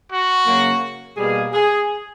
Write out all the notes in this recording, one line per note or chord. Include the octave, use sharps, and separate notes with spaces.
F#4
C#3 F#3 A#3
B2 G3 A#3 G#4
G#4